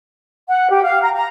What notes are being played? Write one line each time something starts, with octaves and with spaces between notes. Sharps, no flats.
F#5
G4
F5
A#5
A#5